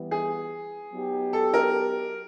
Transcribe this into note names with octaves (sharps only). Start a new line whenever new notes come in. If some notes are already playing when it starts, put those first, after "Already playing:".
Already playing: E3 G3 B3
G#4
F#3 B3 D#4 G4
A4
A#4